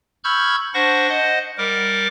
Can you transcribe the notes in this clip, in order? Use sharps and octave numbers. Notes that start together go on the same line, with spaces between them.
B5 C#6 E6 F6 G6 G#6
D4 C5 F#5 C#6 A#6
C5 D#5 F#5
G3 A#4 D6